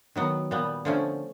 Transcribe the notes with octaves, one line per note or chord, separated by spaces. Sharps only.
D#3 F#3 B3
A#2 G3 B3
D3 F3 A3 C#4